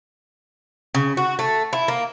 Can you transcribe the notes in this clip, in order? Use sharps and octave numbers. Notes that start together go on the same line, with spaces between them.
C#3
F#4
A3
E4
A#3